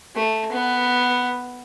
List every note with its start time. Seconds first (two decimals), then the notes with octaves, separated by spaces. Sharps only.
0.16 A3
0.52 B3